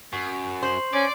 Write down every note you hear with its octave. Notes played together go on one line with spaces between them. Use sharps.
F#2 C#6
C5 C6 C7 F#7
C#4 D5